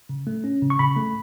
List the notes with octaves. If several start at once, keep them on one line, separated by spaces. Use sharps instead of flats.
C#3
A3
C#4
C#3
C#6
C#3 B5
A3